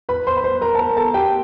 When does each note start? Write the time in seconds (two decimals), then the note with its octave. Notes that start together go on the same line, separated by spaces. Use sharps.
0.09 B4 B5
0.27 C5 C6
0.37 B5
0.44 C5 C6
0.61 A#4 A#5
0.75 A5
0.79 A#4 A#5
0.97 A4 A5
1.14 G4 G5